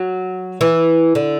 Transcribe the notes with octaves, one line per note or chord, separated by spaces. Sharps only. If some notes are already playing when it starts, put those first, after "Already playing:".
Already playing: F#3
E3
D3